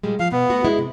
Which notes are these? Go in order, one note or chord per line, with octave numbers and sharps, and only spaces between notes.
A#2 G3 G#3
F3 F5
B2 B3
A3 F#4
G#3 E4
C3